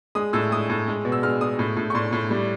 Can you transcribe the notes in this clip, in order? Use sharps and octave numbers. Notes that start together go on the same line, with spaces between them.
G#3 D#6
A2 E6
G#3 D#6
A2
G#3
B2
E6
G#3 F6
G#3 D#6
A2
A2
C#6
A2 C6
A2
G3